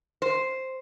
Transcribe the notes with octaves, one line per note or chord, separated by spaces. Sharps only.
C5